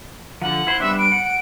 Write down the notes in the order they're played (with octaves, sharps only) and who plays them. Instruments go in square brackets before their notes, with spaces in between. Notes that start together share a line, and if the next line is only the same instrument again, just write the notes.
[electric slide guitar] D3 F3 [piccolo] F#5
[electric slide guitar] E4 C5
[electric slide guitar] G3 B3 D4 [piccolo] E5
[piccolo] D7
[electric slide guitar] F#5